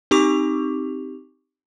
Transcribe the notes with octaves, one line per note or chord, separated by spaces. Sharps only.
C4 D#4 G4 C#6 D6 F7